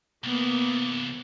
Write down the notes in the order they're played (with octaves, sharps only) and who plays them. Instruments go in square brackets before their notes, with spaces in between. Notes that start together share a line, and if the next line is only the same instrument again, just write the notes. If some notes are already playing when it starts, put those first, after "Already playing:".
[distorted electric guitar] C2 E3 [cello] A#3 B3